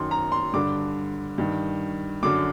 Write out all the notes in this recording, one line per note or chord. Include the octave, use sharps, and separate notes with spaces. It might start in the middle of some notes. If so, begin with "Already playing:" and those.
Already playing: F#2 D#3 C6
A#5
C6
G2 D3 D6
G2 D#3
F#2 D3 D6